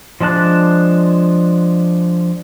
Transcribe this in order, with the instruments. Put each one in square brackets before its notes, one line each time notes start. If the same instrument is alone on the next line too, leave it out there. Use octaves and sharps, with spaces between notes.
[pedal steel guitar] F3 G#3 D4 A5 F#6